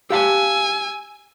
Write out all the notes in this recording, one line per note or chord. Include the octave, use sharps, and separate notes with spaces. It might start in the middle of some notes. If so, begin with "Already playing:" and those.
G4 F5 G#5 A5 E6